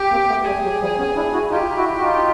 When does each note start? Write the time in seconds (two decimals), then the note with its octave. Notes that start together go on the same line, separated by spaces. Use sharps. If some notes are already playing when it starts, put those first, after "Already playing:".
Already playing: G4
0.11 A#3 C4
0.28 A3 B3
0.45 G3 A3 G#4
0.63 F#3
0.81 F3 G3
0.98 B3 C#4
1.16 D4 E4
1.33 E4 F#4
1.51 D#4 F4 G4
1.77 E4 F#4
1.99 F#4
2.03 D#4 F4